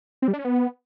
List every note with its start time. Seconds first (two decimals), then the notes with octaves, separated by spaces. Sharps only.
0.22 C4
0.28 G3
0.33 D4
0.39 C#4
0.45 B3